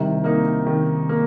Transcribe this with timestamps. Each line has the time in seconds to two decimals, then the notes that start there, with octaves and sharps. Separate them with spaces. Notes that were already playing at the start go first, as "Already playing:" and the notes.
Already playing: C2 C3 D#3
0.24 A#3 D#4
0.67 D#3
1.09 A#3